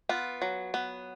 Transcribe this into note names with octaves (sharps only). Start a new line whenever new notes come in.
B3 F4
F#3
B3